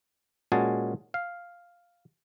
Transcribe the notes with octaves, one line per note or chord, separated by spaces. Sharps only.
A#2 G#3 C#4 F#4 G#4 A5
F5